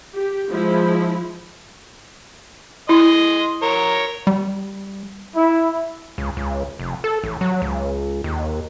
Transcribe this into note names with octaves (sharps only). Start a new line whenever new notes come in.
G4
F3 G#3 E4
E4 D#5 C6
A#4 C#5
G3
E4
C#2
C#2
F1
A4
A1
F#3
C#2
D#2